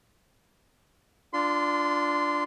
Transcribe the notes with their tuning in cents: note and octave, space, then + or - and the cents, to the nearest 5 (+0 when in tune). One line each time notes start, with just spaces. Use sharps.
D4 +0 F4 +0 C6 -25